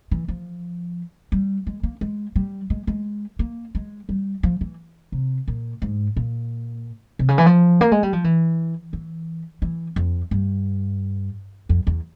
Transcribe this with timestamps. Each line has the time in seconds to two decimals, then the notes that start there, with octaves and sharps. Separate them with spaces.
0.11 E3
0.28 F3
1.32 G3
1.67 G#3
1.83 A#3
2.01 G#3
2.36 G3
2.70 G#3
2.87 G#3
3.39 A#3
3.75 G#3
4.09 G3
4.43 F3
4.61 E3
5.12 C3
5.48 A#2
5.82 G#2
6.16 A#2
7.19 C3
7.28 C#3
7.38 E3
7.46 F3
7.81 A#3
7.92 G#3
8.03 G3
8.13 F3
8.24 E3
8.93 E3
9.62 E3
9.96 F2
10.31 G2
11.69 F2
11.87 E2